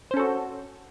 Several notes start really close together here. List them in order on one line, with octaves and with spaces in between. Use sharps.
C5 C#4 A4 F#4